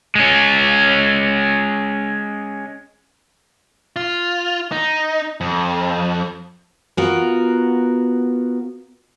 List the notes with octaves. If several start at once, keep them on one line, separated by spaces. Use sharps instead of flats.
G#3 C#4
F4
D#4
F2
B3 F4 F#4 A#4